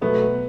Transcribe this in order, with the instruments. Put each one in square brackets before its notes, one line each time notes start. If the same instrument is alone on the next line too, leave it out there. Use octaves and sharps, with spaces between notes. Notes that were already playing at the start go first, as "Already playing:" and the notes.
[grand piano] B2 F#3 A3 [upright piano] B3